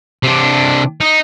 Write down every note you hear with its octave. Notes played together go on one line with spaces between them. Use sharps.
C3 D4
D#4